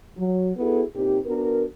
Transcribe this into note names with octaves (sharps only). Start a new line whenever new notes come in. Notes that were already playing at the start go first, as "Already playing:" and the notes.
F#3
B3 E4 F#4 G#4 A4
A#2 C4 D#4 G4
B3 D4 F#4 A#4